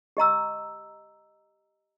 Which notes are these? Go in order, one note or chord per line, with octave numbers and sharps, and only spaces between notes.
G4 D#5 A#5 E6